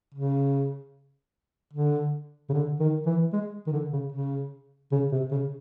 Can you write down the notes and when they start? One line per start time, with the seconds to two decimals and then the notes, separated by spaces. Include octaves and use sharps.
0.15 C#3
1.74 D3
2.49 C#3
2.53 D3
2.80 D#3
3.06 E3
3.33 G#3
3.67 D#3
3.73 D3
3.92 C#3
4.12 C#3
4.92 C#3
5.12 C3
5.31 C#3